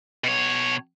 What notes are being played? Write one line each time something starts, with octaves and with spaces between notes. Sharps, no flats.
B2 C#5